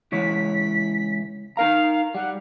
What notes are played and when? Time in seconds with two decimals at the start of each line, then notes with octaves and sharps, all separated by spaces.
0.12 C#2 E3 C#5 B6
1.57 D#4 A#4 F5 A#5
2.15 G3 F#5